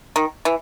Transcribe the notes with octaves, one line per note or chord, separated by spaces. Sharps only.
D#3
E3